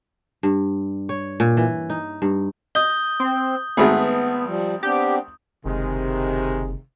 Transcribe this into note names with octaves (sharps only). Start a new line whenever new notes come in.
G2
C#5
A#2
E3
D#4
G2
D#5 D#6 G6 G7
C4
G#1 A3 B3 G#4
F3 G3
B3 C4 D4 G4
F#1 C3 D#3 G#3